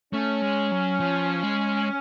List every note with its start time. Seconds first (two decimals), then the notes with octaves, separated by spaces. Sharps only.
0.13 A3 C#4
0.42 G#3
0.71 F#3
1.00 F3
1.43 G#3